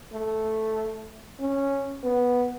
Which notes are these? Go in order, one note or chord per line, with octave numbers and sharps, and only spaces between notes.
A3
C#4
B3